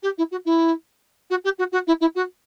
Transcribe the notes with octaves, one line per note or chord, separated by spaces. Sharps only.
G4
E4
F#4
E4
F#4
G4
F#4
F#4
E4
E4
F#4